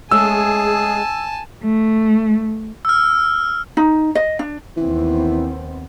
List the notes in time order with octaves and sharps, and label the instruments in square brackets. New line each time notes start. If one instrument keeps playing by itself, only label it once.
[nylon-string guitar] G#3 A3 C#4 [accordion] G#4 [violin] G#5 A5 [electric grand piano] E6
[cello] A3
[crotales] E6 F6
[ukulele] D#4
D#5
D4
[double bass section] D#2 B3 C4 [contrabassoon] E3